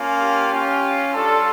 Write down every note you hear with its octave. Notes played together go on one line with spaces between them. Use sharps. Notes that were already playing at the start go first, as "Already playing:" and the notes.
Already playing: A#3 C#4 F4
G4
C#4 F4
G3 D4 F4 A4